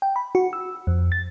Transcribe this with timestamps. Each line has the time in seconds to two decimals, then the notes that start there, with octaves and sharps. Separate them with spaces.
0.02 G5
0.16 B5
0.35 F#4
0.53 E6
0.87 F2
1.12 A6